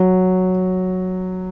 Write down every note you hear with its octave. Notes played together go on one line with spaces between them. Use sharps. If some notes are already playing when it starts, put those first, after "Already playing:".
Already playing: F#3